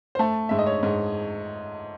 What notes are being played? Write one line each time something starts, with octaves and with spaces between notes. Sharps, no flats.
C5
A3 A4
G#2 E5
D#5
C#5
G#2